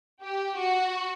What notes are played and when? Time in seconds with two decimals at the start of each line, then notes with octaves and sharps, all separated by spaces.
0.22 G4
0.56 F#4